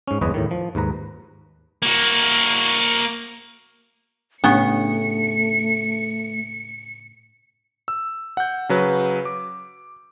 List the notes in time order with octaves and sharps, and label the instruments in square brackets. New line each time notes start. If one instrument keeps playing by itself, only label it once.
[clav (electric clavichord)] G#2 C#4
G1 E2 G#3 B4 C#5 D#5
E2 A2 D#3
F3
D#2 G#2 B4 A#5
[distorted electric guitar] A#3 F#4
[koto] A2 C#3 B3 [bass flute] A3 [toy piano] D4 G4 [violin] C#7
[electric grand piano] E6
F#5 G6
C#3 F#3 B4
D6